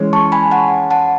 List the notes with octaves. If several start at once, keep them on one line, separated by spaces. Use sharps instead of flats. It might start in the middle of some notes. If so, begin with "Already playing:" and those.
Already playing: E3 G#3 C#4
A5 C#6
G#5 B5
F#5 A5
F#5 A5